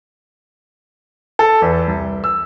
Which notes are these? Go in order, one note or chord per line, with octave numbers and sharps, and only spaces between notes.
A4
E2
C2
E6